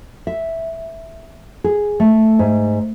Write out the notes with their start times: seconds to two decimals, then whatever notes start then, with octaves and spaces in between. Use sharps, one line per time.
0.27 E5
1.64 G#4
2.00 A3
2.39 G#2